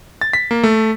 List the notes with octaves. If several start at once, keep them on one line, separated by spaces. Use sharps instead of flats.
A6
B6
A#3
A3